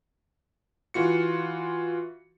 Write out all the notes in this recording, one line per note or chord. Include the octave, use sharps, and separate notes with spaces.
E3 F4 F#4 C#7